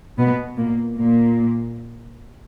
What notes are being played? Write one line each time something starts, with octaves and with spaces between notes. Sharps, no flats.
B2 B3
A#2 A#3
A#2 A#3